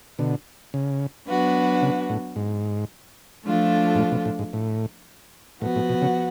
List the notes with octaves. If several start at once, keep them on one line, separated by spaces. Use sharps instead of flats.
B2 D3
C#3
F#3 B3 D4 F#4 B4
C#3
A2
G#2
F3 A3 D4 F4 A4
G#2
A2
B2
A2
G#2
A2
A2 F3 B3 F#4
A2
B2
C#3